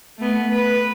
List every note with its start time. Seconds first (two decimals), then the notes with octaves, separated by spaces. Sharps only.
0.17 A3 B3
0.52 B4